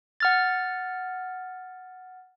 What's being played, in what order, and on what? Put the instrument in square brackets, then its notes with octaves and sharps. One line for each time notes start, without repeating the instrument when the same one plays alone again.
[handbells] F#5 F6 A6